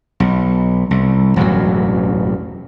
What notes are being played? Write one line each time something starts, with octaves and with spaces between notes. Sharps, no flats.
B1
C2
E1 A1 F#2 F#3